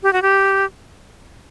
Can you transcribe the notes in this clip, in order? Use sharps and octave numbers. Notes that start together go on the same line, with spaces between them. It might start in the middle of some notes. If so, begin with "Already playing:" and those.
G4
F#4
G4